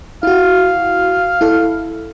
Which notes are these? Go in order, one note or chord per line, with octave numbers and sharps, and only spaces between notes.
E4 F#4 F5
E4 A4